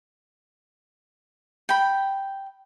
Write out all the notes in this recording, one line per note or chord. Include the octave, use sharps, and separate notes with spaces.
G5 B5